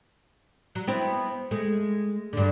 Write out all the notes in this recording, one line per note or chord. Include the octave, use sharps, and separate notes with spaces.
F#3
B3 C4 E4
G#3 A3
G2 D3